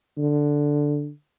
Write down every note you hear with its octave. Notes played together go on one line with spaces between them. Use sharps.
D3